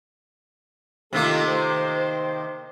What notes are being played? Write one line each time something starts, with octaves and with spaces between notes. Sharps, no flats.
C3 D#3 A3 A#3 F4
C5